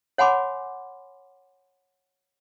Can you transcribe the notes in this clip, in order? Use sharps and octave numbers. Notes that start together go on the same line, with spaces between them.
C#5 F#5 G#5 B5 C6 D6